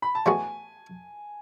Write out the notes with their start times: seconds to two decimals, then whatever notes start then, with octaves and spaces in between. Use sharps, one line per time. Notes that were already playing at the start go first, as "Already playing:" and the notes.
0.02 B5
0.15 A5
0.26 A2 E3 G#3 B3 F#4 G#5